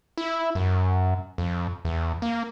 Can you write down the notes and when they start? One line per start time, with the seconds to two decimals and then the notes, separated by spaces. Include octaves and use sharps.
0.18 E4
0.55 F#2
1.38 F2
1.85 E2
2.22 A#3